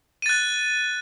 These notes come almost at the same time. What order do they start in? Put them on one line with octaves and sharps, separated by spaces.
D#7 A6 F#6